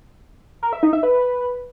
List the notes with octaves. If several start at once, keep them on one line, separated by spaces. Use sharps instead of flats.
A#4
E5
D#4
E5
B4